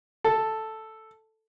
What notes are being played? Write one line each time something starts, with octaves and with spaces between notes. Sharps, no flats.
A4